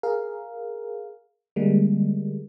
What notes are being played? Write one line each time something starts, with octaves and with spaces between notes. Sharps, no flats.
G#4 A#4 F5
D3 G3 G#3 A#3